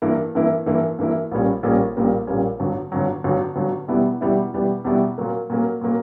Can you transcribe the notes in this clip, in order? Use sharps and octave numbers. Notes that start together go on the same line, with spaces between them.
G2 E3 A#3 E4
G2 E3 A#3 E4
G2 E3 A#3 E4
G2 E3 A#3 E4
A#1 A#2 G3 A#3 C#4
A#1 A#2 G3 A#3 C#4
A#1 A#2 G3 A#3 C#4
A#1 A#2 G3 A#3 C#4
G1 G2 F#3
G1 G2 F#3
G1 G2 F#3
G1 G2 F#3
E2 B2 G3 B3 E4
E2 B2 G3 B3 E4
E2 B2 G3 B3 E4
E2 B2 G3 B3 E4
A#2 F#3 A#3
A#2 F#3 A#3
A#2 F#3 A#3